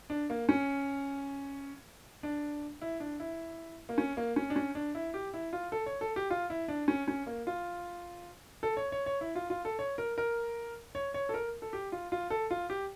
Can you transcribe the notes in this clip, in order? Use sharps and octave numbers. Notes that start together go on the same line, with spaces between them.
D4
A#3
C#4
D4
E4
D4
E4
A#3
C#4
A#3
C#4
D4
C#4
D4
E4
G4
E4
F4
A4
C#5
A4
G4
F4
E4
D4
C#4
C#4
A#3
F4
A4
C#5
C#5
C#5
E4
F4
F4
A4
C#5
A#4
A#4
C#5
C#5
A4
A#4
A4
G4
F4
F4
A4
F4
G4